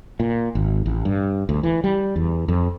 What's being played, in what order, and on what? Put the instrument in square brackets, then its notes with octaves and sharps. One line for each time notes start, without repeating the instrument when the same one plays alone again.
[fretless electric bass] A#2
G#1
A1
G2
D2
E3
G3
E2
F2